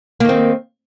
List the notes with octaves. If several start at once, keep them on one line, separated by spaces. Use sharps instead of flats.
D#3 A#3 C4